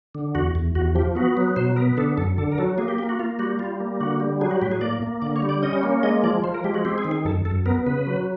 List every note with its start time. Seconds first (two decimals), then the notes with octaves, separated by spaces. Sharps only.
0.15 D3
0.35 E2 F#4
0.55 E2
0.75 E2 F#4
0.95 F3 G4
1.15 B3 F#4
1.37 F#3
1.56 B2 C5
1.76 B3 A#4
1.97 D3 A4
2.17 F#2 A4
2.38 D3 A4
2.52 A#4
2.58 F#3 A4
2.78 A#3 G#4
2.88 G4
2.98 A#3 G4
3.09 F#4
3.19 A#3 F4
3.39 G3 F#4
3.59 G3 F4
3.80 A#3
4.00 D3 F#4
4.20 G3
4.41 F#3 G#4
4.51 F#4
4.62 A2 G4
4.72 G#4
4.81 A#3 D5
5.02 A#3
5.22 D3 D5
5.36 C#5
5.42 G3
5.49 D5
5.62 C#4 D#5
5.83 A#3
6.03 G#3 D#5
6.23 F3 D5
6.44 F3 C5
6.54 A#4
6.64 G#3 G4
6.74 F#4
6.85 C4 G4
6.98 G#4
7.05 D#3
7.11 G#4
7.25 F#2 A4
7.45 F#2 A4
7.66 B3 A#4
7.86 C#3 B4
8.07 F#3